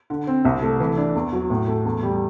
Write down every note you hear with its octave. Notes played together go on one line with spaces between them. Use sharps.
D3
C4
C2
A3
E3
D4
E2
F#3
A2
A3
E2
G3